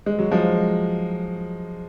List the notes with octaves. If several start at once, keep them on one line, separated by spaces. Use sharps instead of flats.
G#3
F#3
F3 G#3